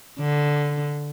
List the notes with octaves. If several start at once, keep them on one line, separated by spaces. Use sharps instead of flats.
D3